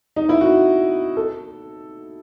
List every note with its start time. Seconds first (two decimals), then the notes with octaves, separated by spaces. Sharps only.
0.16 D#4
0.29 E4
0.41 F#4
1.17 A4